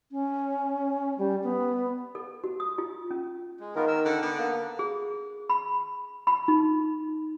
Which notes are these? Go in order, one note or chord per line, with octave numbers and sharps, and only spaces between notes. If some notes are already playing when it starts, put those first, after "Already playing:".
C#4
G3
B3
A4
F#4
D#6
F4
C#4
G#3
D#3 B3 F4 A#4
A#4 E6
D3 F#5
D3 B3
A#3
G#4
B5
B5
D#4